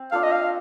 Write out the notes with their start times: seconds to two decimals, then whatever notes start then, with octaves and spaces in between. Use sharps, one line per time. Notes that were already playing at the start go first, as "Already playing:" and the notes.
Already playing: C4
0.12 D4 F4 A4 F5
0.23 D#5
0.32 F5